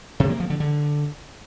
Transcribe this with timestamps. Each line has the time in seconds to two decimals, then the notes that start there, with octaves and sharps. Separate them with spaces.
0.20 C3
0.30 A#3
0.40 F3
0.50 D3
0.60 D3